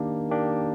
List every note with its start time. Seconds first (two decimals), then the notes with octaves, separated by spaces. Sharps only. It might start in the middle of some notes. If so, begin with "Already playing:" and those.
Already playing: D#3 A#3 D4 G4
0.31 D#3 A#3 D4 G4